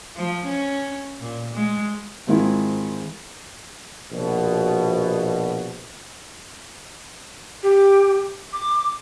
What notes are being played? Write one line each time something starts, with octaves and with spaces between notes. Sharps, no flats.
F3
C#4
A#2
G#3
G#2 D#3 G#3 C4 E4 F4
A#1 B2
G4
D6